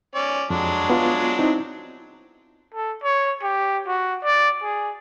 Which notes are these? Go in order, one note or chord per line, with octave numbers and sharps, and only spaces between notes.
C#4 D5
F2 F#3 G#3 D4
B3 F4
C4 D#4 E4
A4
C#5
G4
F#4
D5
G#4